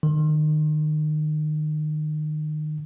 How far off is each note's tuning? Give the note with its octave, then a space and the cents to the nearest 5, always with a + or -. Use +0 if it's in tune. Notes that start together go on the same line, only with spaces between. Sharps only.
D#3 -30